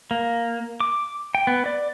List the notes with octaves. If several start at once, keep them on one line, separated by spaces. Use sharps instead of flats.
A#3
D6
G5
B3
D5